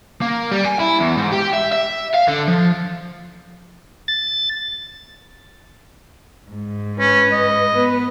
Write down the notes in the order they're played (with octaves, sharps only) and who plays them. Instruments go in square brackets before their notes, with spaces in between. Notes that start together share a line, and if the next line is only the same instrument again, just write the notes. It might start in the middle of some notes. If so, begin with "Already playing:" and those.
[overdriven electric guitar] A#3
G3
G#5
E4
E2
G#2
G4
E5
E5
F5
D3
F3
[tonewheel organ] A6
[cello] G#2
[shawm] C#4 [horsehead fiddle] B4
[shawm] D#5
[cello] B3 [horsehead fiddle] B4